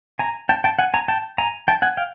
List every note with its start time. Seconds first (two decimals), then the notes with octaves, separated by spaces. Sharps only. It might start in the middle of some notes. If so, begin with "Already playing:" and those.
0.19 G#5 A#5
0.49 G5 A5
0.64 G5 A5
0.79 F#5 G#5
0.94 G#5 A#5
1.08 G5 A5
1.38 G#5 A#5
1.68 G5 A5
1.82 F#5 G#5
1.97 F5 G5